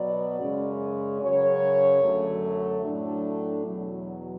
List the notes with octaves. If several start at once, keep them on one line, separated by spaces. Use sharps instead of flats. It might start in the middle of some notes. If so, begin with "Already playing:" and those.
Already playing: B2 F#3 B3 D5
F#2 C#3 G#3 C#4
F#2 C#3 F#3 C#5
F#2 D3 F#3 A3
A2 F#3 A3 D4
E2 B2 F#3